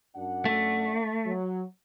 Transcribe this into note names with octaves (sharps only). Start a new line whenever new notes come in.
F#2 D4 F#5
A3
F#3